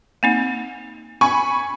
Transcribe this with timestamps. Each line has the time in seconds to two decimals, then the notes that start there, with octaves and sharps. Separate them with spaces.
0.23 A#3 C4 D#4
1.21 G#5 B5 C#6